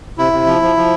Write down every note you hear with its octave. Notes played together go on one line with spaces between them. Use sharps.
C3 E4
C3
F3
F3
F3